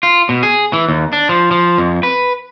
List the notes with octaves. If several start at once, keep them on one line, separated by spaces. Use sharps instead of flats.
F4
B2
G#4
E3
D#2
D4
F3
F3
F2
B4